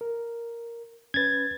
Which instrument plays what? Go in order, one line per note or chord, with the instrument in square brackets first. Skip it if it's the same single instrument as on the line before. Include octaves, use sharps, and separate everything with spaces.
[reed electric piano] A#4
[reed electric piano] C#4 B4 [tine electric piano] G#6 A6